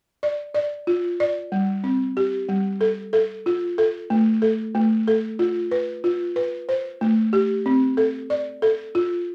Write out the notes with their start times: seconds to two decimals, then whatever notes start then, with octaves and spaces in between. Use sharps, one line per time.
0.23 D5
0.54 D5
0.87 F4
1.20 D5
1.52 G3
1.84 C4
2.17 G4
2.49 G3
2.81 A4
3.13 A4
3.46 F4
3.78 A4
4.10 A3
4.42 A4
4.75 A3
5.08 A4
5.39 F4
5.71 B4
6.04 F4
6.36 B4
6.69 C5
7.01 A3
7.33 G4
7.66 C4
7.97 A4
8.30 D5
8.62 A4
8.95 F4